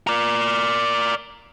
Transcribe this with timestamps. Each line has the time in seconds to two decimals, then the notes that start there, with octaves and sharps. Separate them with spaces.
0.07 A#4 D5